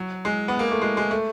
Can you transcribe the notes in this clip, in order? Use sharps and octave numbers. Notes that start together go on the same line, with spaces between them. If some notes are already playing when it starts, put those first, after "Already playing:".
Already playing: F#3
G#3
B3
A#3
A3
G#3
G#3
A3